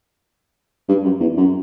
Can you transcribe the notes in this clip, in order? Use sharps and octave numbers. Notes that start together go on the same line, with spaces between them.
G2
F#2
E2
F#2